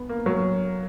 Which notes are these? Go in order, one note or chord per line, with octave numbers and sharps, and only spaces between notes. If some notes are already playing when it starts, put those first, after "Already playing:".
Already playing: B3
A#3
F#3